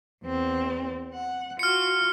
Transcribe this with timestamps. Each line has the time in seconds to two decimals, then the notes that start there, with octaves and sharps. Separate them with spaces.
0.24 E2 C4
1.14 F#5
1.59 F4 F#4 F6 C#7